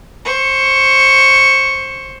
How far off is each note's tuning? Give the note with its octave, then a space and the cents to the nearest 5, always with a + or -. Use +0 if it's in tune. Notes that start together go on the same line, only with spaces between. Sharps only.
C5 +20 C#6 +0